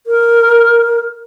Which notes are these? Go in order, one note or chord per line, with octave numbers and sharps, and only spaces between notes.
A#4